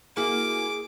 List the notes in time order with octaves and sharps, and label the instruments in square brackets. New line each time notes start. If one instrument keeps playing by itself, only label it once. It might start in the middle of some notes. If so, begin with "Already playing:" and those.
[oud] A#3 E4 F#4 [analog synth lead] G#4 [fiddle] D6